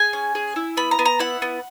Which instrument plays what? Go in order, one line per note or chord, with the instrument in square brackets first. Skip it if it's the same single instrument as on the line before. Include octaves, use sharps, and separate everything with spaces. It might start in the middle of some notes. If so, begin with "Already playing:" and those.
Already playing: [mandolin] G#4 G#5
C#4
G#4
E4
B3 B5
A#5
B3
A#5
E4 F#5
B3